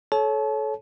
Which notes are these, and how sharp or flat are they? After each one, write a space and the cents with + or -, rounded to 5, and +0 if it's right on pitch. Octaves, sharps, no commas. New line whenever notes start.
A4 -30 C#5 +0 A5 -35